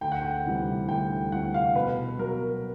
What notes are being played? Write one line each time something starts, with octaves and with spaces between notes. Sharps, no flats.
D2 G5
F#5
G5
C3 E3 G3
D2 G5
C3 E3 G3 F#5
F5
B2 B4
F#3 B3 A#4